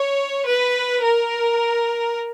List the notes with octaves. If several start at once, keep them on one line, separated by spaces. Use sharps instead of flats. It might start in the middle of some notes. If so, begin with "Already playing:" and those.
Already playing: C#5
B4
A#4